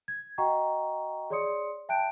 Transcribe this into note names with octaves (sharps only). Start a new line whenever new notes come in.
G#6
F#4 D#5 F#5 G5 A#5 C#6
G#4 C#5 D5 C6 D#6 C#7
E5 G5 A5 F#6 G6 D7